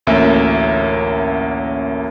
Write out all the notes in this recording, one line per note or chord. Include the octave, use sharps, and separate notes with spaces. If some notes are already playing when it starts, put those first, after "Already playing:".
A1 D2 A#3 C#4 E5